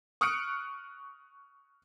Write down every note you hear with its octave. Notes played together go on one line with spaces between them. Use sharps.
C#6 D#6 F6 F#6 C#7 D7